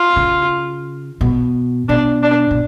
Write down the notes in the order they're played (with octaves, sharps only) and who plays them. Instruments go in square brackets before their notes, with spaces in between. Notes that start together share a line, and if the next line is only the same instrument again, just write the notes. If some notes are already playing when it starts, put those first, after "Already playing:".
Already playing: [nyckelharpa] F4
[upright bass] C#3
B2
[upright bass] B2 [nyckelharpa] D4
[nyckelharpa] D4
[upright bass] B2